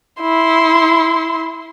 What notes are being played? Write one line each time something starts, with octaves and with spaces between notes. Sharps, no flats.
E4 C6